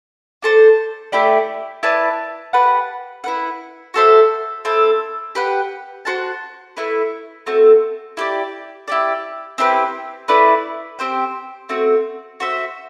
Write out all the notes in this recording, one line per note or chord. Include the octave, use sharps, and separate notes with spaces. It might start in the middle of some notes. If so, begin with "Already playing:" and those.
D4 A4 C5
A3 E4 G4 D5
E4 B4 D5 A5
G4 B4 F#5 A5
E4 B4 F#5
F#4 A4 C5 E5
C4 E4 A4
G4 B4 F#5
F#4 C5 F#5 A5
A3 E4 B4
A3 C4 F#4 A4
E4 G4 D5
E4 G4 D5
C4 E4 G4 B4
A3 E4 B4 D5
C4 G4 C5 G5
A3 C4 F#4
F#4 C5 E5